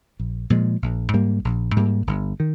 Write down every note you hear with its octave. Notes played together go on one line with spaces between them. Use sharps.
A#1
A#2 F3 G#3
A#1
G#2 G3 A#3
A#1
G#2 G3 A#3
G1
D#3